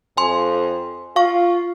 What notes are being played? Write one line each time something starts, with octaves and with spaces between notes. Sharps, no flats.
F2 G#5 C6
F4 F5 C#6